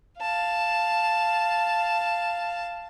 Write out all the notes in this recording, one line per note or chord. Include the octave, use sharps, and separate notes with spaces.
F5 A5